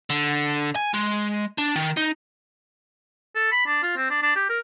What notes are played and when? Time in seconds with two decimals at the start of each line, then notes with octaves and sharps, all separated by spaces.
0.10 D3
0.76 G#5
0.94 G#3
1.58 D4
1.76 D#3
1.97 D#4
3.35 A4
3.52 B5
3.66 D4
3.83 F4
3.96 C4
4.10 D4
4.22 D4
4.36 G4
4.49 A#4